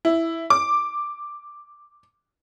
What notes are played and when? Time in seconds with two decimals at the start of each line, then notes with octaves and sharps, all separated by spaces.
0.05 E4
0.50 D6